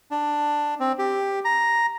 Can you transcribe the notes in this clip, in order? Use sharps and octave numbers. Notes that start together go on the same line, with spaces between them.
D4
C4
G4
A#5